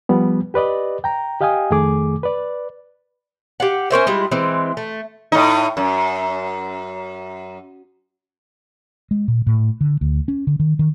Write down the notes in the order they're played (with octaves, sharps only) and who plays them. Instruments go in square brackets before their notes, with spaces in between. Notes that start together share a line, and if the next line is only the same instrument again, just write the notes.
[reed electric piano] F3 G3 B3
G4 B4 D5 D#5
G5 A#5
G4 D#5 F5 G5 G#5 D#6
F2 D#3 A3 G#4 D6
B4 D5
[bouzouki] G4 F5 F#5
C#4 A#4 C5 E5
G3 G#3 E4 F4
E3 G#3 C4
A3
[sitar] A2 D#4
F#2
[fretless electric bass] G#3
A#2
A2
D3
D2
C#4
D3
D#3
D#3